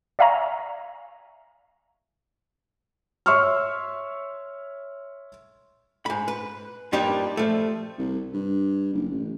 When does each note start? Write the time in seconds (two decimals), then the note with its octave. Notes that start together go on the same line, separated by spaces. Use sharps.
0.19 D5 E5 F5 G#5 A#5 C#6
3.26 C#5 E5 C6 C#6 E6 F6
6.06 G#2 B5
6.28 B4
6.93 G2 F3 G3 A#3 D#4 G4
7.37 F3 A3
7.98 C2
8.33 G2
8.93 F#1
9.11 A1